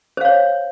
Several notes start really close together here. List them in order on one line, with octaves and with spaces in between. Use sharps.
C5 F5 C#5